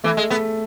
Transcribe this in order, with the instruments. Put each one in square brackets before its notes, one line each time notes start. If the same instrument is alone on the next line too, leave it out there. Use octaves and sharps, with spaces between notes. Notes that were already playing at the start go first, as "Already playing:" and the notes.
[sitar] E3 [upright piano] A3
[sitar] G#3
[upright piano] A3 [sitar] B3